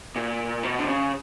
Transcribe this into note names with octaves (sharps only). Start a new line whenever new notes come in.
A#2
B2
D3
C#3